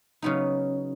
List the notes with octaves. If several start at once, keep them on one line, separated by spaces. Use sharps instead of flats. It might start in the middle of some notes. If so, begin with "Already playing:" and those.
C#3 F#3 B3 D#4